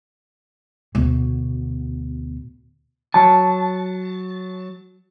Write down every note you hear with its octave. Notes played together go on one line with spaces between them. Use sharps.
D2 B2
F#3 A5